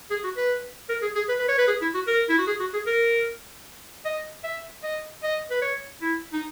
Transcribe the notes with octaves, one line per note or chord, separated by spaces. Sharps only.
G#4
F#4
B4
A#4
G#4
G#4
B4
B4
C#5
B4
G#4
E4
F#4
A#4
E4
F#4
G#4
F#4
G#4
A#4
D#5
E5
D#5
D#5
B4
C#5
E4
D#4